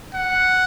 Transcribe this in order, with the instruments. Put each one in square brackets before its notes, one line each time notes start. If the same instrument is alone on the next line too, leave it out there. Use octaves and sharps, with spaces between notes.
[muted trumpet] F#5